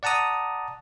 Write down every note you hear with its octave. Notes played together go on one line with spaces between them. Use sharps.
D5 F#5 A5 A#5 D#6